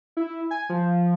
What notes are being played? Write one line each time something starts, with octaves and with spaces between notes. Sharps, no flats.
E4
G#5
F3